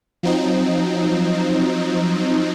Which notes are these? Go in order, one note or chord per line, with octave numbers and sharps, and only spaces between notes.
F3 F#3 C4 D#4